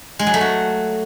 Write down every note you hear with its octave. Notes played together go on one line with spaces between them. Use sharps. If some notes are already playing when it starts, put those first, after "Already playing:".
G#3
F#3
A3
F#4